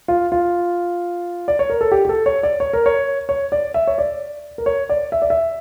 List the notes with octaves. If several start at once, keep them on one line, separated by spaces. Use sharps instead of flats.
F4
F4
D5
C#5
A#4
A4
G4
G4
A4
C#5
D5
C#5
A#4
C#5
C#5
D5
E5
C#5
D5
A#4
C#5
D5
E5
D5
E5